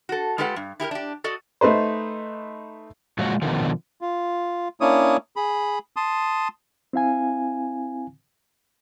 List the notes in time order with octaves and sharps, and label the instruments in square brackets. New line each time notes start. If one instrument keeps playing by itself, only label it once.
[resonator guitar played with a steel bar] F#4 A4
G#3 F4 G4 A4 B4 F#5
G2
E4 G4 G#4 A#4
D4 G4
F#4 A4 D5 D#5
[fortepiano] A3 D#4 B4 C5
[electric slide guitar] A#2 F3 F#3 G#3 F4 F#4
B2 D3 D#3 F3
[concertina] F4
A#3 C#4 D4 E4 C#5 D#6
G#4 B5
A5 C6 D#6
[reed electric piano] C4 E4 F5 G#5